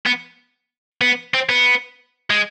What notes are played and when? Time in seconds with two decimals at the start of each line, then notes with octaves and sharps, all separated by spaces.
0.06 B3
1.01 B3
1.34 C4
1.49 B3
2.30 G#3